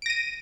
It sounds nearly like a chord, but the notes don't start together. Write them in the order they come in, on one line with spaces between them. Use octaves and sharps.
D7 A#6 D#7